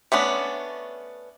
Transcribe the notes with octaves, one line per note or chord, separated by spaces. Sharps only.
A3 B3 C#4 D4